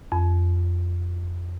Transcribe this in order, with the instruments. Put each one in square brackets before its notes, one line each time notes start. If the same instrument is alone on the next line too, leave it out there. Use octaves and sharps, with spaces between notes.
[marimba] F2